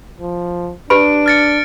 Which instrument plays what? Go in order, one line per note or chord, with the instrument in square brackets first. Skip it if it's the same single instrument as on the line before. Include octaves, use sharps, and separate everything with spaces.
[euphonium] F3
[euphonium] D4 [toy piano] G4 B4 B5 [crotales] D7
[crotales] F6 A6 C#7